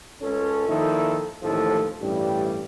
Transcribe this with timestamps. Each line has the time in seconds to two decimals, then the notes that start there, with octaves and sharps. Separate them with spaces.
0.21 C#2 C#4 A4
0.68 A#2 D#3 F3 D#4 E4 A4
1.43 A1 D#2 A2 F3 A4
2.01 A1 G2 G3